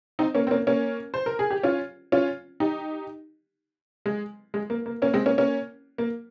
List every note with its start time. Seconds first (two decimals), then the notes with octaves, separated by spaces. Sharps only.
0.19 C4 D#4
0.35 A#3 C#4
0.47 C4
0.51 A#3 C#4
0.67 A#3 C#4
1.14 C5
1.26 A#4
1.39 G#4
1.51 G4
1.63 C#4 F4
2.12 C#4 F4
2.60 D#4 G4
4.06 G#3
4.54 G#3
4.70 A#3
4.86 A#3
5.02 A#3 C#4
5.13 G#3 C4
5.26 A#3 C#4
5.38 A#3 C#4
5.98 A#3